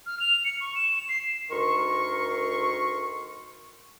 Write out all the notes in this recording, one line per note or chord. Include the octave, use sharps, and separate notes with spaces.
F6
F7
C#7
C#6
E7
C7
D2 D#3 A#4 C6 C#6